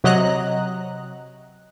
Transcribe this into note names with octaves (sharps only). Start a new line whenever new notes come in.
C3 F#3 D#5 A#5 F#6